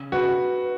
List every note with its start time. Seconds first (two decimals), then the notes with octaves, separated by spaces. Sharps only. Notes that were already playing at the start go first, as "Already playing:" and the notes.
Already playing: C#3
0.12 F#4 B4